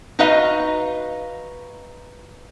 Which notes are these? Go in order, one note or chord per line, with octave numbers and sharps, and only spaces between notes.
D#4 F#4 B4 D#5 F5